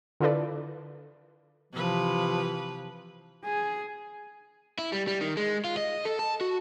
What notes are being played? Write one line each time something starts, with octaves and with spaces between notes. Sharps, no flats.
D3 E4 F4 A4 B4 D5
C3 E3 F3 B4
G#4
E4
G3
G3
D#3
G#3
F4
D#5
A4
A5
F#4